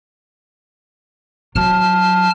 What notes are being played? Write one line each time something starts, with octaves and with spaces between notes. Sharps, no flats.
F#3 A5 F6